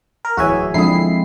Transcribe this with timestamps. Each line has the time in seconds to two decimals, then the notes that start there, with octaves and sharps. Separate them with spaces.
0.25 A#4
0.37 D1 E3 F#4 G#4 C#5 E5 G#5
0.74 D3 F3 G#3 C4 E4 B5 D#6 C7